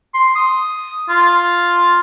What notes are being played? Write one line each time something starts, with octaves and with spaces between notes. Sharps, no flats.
C6
D#6
F4